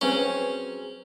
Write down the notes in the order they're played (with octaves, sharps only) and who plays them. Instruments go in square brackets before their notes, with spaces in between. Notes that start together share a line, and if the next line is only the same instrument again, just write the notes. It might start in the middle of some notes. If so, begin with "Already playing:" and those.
[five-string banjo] F#3 C4 G#4 [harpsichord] C#4 [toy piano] B4 C#6